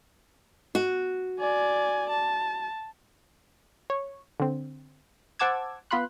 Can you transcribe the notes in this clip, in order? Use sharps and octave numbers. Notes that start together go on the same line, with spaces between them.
F#4
D5 G#5
A5
C#5
D3 C4
C5 F#5 A5 D6 E6 G#6
B3 F4 B5 C6 F#6